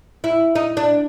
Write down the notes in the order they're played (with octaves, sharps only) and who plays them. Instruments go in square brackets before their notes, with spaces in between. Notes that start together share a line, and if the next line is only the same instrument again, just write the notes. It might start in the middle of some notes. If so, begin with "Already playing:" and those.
[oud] E4
D#4
D4